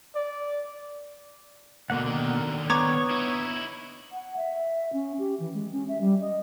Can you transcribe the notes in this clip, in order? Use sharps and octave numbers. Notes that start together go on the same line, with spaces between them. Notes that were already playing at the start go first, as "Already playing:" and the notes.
D5
D2 B2 D3 A#3 F#5
D3 D#3
B3 C#5 A#5 D6 G#6
D#4 E4
F#5
E5
C#4
G4
E3
G#3
C#4
E5
G3
D#5